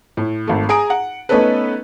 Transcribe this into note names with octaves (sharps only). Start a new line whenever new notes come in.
A2
G#1 A3
G#4 G#5 A#5 D#6 D7
F#5
A3 B3 C#4 D#4 A4 B4